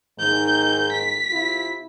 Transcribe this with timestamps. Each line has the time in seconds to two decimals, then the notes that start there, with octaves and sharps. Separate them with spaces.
0.20 G#2 D#3 G6
0.92 B6
1.31 C3 E4 F4